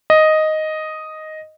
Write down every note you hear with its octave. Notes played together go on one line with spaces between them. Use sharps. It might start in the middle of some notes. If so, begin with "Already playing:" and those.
D#5